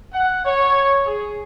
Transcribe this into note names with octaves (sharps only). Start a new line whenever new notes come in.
F#5
C#5
G#4